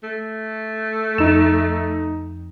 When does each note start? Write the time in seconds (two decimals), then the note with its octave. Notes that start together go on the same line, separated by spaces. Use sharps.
0.03 A3
1.18 F2 D#4 E7